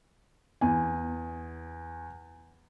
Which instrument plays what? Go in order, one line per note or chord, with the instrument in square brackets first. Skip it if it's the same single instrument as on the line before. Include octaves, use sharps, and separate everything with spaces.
[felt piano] E2 G#5